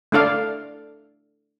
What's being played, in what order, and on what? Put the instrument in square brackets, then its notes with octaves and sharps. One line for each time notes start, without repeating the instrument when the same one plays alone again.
[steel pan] A3 D4 A4 D5 F5